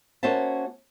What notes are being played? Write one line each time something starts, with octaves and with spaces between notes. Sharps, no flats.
A#3 C#4 F#4 C5 E5 A5